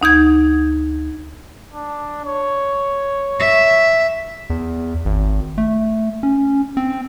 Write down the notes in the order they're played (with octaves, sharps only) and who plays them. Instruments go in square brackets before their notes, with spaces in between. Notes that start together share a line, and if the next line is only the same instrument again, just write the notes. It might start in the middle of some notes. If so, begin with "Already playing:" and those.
[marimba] D2 D#4 G6 G#6
[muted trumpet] D4
C#5
[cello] E5
[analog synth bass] E2
G#1
A3
C#4
C4